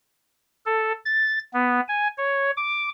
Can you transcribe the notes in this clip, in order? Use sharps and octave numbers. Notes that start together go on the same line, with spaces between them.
A4
A6
B3
G#5
C#5
D6